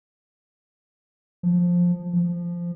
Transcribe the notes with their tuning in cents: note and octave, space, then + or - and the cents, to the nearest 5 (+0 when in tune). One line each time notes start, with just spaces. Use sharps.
F3 +10
F3 -10